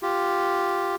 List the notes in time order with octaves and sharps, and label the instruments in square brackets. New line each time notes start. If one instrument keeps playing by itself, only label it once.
[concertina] F4 G4